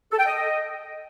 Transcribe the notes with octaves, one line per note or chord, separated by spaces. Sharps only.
A4
G5
D#5